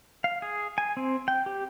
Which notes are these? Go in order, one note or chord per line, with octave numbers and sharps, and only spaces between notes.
F5
G#4
G#5
C4
G5
G4